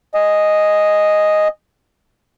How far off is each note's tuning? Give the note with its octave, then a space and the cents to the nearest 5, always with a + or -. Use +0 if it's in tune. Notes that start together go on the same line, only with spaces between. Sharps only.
D#5 +0 G#5 -5